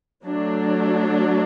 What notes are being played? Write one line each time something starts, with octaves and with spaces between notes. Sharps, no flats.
F#3 A3 D4